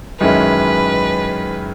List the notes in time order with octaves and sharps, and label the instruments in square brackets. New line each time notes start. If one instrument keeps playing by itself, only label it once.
[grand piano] F#2 D#3 G#3 C#4 E4 [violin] B4